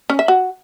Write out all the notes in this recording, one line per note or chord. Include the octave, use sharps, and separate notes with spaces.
C#4
E5
F#4